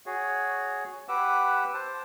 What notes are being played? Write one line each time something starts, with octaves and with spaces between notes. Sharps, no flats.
F#4 G#4 C#5
G4 B4 F#5 D6 E6
C5 A5